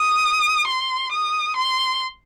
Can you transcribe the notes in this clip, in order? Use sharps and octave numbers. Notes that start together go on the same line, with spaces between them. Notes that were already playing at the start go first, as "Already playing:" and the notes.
Already playing: D#6
C6
D#6
C6